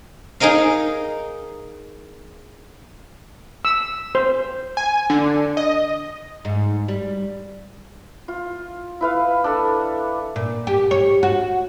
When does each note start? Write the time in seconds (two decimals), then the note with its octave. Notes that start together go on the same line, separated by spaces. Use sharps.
0.40 D#4 G#4 A#4 D#5 F5
3.65 E6
4.15 C5
4.77 G#5
5.10 D3
5.57 D#5
6.45 G#2
6.88 G3
8.28 F4
9.01 E4 B4 F5
9.44 D4 A4
10.36 A#2
10.67 G4
10.91 C#5
11.23 F#4